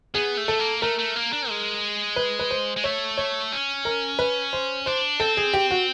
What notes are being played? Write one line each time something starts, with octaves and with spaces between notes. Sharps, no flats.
B3 G#4
A3
A4
A#3
A3 A#4
A3
A#3
D4
G#3
B4
B4
C5
G#3
A3 C#5
C#5
C#4
A#4
B4
C5
D4 C5
C4 A4
G#4
G4
F#4